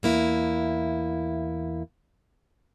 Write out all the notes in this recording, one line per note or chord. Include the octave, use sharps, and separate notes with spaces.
E2 A#3 E4